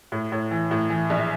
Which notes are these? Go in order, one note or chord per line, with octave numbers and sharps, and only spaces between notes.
A2
A2
E3
A2
E3
A#1